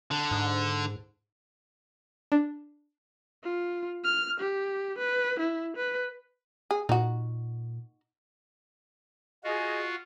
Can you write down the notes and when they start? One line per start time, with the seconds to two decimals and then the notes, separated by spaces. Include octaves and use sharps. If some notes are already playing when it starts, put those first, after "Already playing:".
0.11 D3
0.31 G#2
2.32 D4
3.44 F4
4.05 F6
4.40 G4
4.98 B4
5.40 E4
5.77 B4
6.71 G#4
6.89 A#2 D#4 F#4
9.44 F4 F#4 G#4 D#5